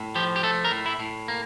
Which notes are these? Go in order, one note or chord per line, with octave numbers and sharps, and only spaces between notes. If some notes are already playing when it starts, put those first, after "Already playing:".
Already playing: A2
F3 G4
G4
A3 A4
A#4
A2
E4
A2
A#3